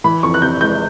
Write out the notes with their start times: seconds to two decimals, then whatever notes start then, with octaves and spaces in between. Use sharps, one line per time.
0.04 E3 B5
0.23 F2 C#6
0.34 F#6
0.42 C3 G6
0.61 G#3 G6